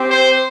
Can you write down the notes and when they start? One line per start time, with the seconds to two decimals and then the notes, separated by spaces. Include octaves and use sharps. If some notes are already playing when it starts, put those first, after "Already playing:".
Already playing: C4 G4
0.11 C5